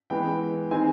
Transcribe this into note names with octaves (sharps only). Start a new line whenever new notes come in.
E3 G#3 B3 G5
D#3 G#3 C4 D#4 G#5